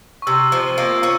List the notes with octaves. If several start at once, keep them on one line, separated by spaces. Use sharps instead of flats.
C#6
C3 E6
F3
A#3
C#4